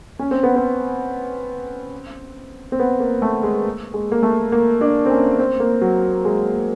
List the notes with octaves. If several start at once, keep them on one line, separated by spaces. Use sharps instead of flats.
C#4
C4
B3
C4
C4
B3
A#3
A3
G#3
G#3
A#3
A3
A#3
D4
C4
C#4
C4
A#3
F#3
G#3